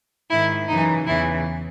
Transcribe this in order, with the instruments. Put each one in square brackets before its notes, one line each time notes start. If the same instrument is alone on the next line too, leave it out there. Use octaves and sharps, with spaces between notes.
[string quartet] G#2 D#3 E4
F#2 C#3 E3 D#4
E2 C#3 E3 E4